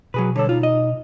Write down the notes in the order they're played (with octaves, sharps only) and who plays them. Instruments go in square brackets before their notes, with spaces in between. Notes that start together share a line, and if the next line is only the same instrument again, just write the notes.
[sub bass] B2 [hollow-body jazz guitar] F#3 G#4 B4
[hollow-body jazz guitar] D3 G3 A4 [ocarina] C#5
[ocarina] D#4 [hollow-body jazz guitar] F4
[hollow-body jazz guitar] D#5